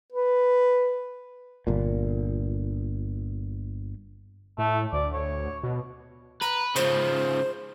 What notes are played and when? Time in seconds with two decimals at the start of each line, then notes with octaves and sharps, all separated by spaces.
0.12 B4
1.67 G1 A#2
4.58 A2 A3
4.93 D2 D5
5.14 C#5
5.63 B2
6.42 B4 A#5
6.76 C#3 F3 C5